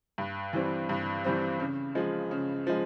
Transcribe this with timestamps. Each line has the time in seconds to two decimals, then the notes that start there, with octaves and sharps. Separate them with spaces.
0.18 G2
0.53 E3 G3 C4
0.89 G2
1.24 E3 G3 C4
1.60 C#3
1.95 F3 G#3
2.31 C#3
2.67 F3 G#3